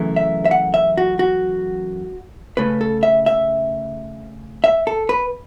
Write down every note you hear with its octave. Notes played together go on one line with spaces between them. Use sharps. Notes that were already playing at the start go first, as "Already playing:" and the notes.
Already playing: F#2 C#3 E3 A3
E5
E5
F#5
E5
F#4
F#4
C#3 A3 C#4 B4
A4
E5
E5
E5
A4
B4